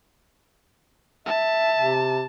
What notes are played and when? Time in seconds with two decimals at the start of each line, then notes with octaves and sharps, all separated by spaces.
1.26 E5 A5
1.78 C3